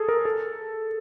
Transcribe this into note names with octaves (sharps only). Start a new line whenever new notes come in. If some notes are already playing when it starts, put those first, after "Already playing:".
Already playing: G#4 A4
A#4
A4